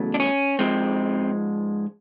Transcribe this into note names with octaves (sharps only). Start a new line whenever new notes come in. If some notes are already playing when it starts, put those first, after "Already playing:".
Already playing: E2 C#3 F#3 A3
D4
C#4
G#2 F3 G#3 C4